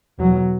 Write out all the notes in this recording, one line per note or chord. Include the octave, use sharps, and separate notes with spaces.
E2 B2 F#3